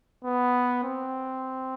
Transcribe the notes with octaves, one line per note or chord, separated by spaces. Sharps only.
B3
C4